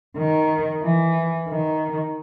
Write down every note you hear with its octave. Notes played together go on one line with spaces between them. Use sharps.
D#3
E3
D#3